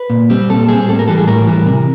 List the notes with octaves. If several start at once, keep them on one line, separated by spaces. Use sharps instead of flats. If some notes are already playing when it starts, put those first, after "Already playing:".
Already playing: B4
A#2
G3 C4
A#2 A4
G3 C4 G#4
A2 A4
A#4
E3 G3 A4
G#4
A2 A#4
E3 G3
C3